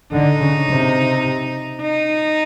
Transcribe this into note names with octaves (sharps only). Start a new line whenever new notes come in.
D3 D#4
C#3
C3
D#4